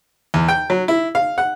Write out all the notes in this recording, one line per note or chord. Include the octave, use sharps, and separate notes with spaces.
E2
G5
F#3
E4
F5
F#5